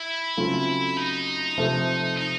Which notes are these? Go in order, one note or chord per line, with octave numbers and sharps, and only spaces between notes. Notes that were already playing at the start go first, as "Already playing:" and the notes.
Already playing: E4
C#3 F#3 A3 C4 F4
D#4
C3 F3 A3
D#4